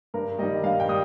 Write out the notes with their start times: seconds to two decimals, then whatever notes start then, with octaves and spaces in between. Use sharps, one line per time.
0.14 G2 A#4
0.38 G3 D#5
0.43 D#3
0.64 G2 F5
0.80 G5
0.88 G3 D#6